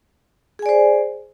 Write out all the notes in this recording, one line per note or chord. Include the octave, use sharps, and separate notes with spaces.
G#4 C5 D5 G#5